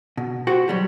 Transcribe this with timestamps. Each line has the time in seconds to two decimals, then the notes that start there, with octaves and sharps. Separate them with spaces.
0.17 B2
0.47 F#4 G4 C5
0.68 F#3 G3 G4